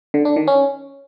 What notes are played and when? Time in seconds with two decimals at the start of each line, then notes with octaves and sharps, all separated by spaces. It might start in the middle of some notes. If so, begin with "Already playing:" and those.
0.14 D3
0.25 D4
0.36 D#3
0.47 C#4